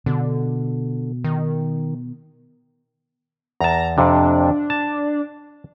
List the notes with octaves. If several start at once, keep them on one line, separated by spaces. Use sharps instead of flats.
B2 D3
D#3
E2 A5 A#5
F2 C3 D4
A5